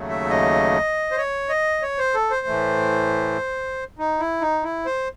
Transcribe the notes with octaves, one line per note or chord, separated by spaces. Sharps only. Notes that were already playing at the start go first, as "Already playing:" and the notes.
Already playing: D#2 C#3 F#3 A3
E5
D#5
C5
C#5
D#5
C#5
C5
A4
C5
A2 E3 A3
D#4
E4
D#4
E4
C5